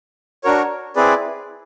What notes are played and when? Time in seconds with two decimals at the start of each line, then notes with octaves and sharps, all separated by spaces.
0.44 D4 F#4 A#4 C#5
0.96 C4 E4 G#4 B4 D5